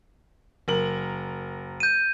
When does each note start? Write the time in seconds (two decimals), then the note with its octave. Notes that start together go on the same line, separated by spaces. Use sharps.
0.68 F#1 A#4 F#7
1.80 G6 D#7